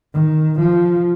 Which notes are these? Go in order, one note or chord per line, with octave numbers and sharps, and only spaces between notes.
D#3
F3